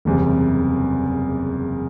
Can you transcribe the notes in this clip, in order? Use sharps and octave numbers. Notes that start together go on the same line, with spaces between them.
F#1 E2 C3 G3